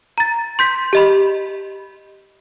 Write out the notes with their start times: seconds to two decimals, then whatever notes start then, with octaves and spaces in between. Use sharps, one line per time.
0.18 A#5 A6
0.59 C6 G6 B6
0.93 G4 D#5 B5